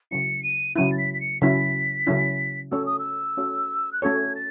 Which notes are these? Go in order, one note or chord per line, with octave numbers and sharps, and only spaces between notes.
C#3 F#3 C#4 E4 C#7
D#7
C#3 F#3 C#4 E4 D#7
A6
B6
B6
C#7
C#3 F#3 C#4 E4 B6
C#3 F#3 C#4 E4
A3 C#4 F#4 A4 C#5 E6
D#6
E6
A3 C#4 F#4 A4 C#5
F#6
A3 C#4 F#4 A4 C#5 G#6
A6